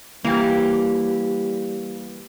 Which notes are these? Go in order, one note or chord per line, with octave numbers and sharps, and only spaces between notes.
E3 G3 A#3 G4